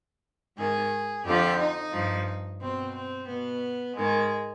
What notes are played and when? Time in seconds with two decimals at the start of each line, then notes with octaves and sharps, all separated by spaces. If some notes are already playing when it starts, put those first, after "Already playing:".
0.57 G#2 D#3 G#4
1.25 F2 D3 F3 G4
1.59 D#4
1.93 G2 F3
2.61 B2 C4
2.95 C4
3.28 B2 B3
3.96 G#2 D#3 G#3